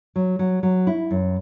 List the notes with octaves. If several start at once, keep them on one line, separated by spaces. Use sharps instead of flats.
F#3
F#3
F#3
E4
F#2